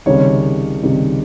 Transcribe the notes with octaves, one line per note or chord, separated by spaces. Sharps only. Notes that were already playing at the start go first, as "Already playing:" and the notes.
C#2 C3 D#3 G3 C#5
C#2 C3 D#3 G3